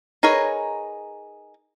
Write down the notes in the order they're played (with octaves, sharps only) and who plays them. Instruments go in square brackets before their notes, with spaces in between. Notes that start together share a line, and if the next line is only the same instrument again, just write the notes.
[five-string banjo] D#4 G#4 A#4 B4 C#5